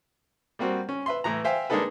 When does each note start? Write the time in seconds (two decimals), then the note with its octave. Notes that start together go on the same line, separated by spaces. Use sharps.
0.59 G3 A#3 C4 F#4
0.89 C#4
1.06 B4 E5 C6
1.24 A2 E3 A#5
1.44 C5 E5 F5 G5 G#5
1.70 G#3 A#3 D4 D#4 A4 B4